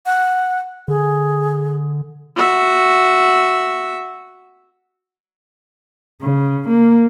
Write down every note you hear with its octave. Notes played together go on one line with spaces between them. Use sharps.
F#5
D3 G#4
F#4 E5
C#3
A#3